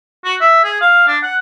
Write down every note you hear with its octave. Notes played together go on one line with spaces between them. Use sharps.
F#4
E5
G#4
F5
D4
F#5